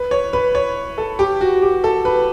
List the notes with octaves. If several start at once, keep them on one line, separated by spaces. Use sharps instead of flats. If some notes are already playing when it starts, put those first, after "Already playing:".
Already playing: B4
C#5
B4
C#5
A4
G4
F#4
G4
A4
B4